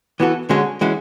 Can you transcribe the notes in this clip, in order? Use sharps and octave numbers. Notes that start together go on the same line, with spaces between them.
E3 B3 F#4 A4
D3 G#3 C#4 F#4
E3 G#3 C#4 F#4